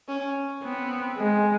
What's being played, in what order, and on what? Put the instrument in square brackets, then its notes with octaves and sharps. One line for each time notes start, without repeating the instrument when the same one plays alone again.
[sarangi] C#4
[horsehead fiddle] B3 [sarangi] C4
[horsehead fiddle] G#3